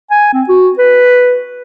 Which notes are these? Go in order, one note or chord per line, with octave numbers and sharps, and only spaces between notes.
G#5
C4
F#4
B4